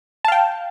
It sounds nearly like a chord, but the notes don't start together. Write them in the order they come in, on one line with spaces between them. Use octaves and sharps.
A5 F5 G5